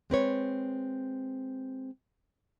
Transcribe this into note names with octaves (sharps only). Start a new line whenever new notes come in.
G#3 C4 B4 C#5